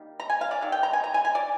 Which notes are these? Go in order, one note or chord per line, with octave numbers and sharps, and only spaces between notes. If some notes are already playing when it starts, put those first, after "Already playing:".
Already playing: D#3 G3 A#3
A#5
G#5
F5
D5
C3 D#3
G5
A#5
G#5
A#5
G#5
G#5
D5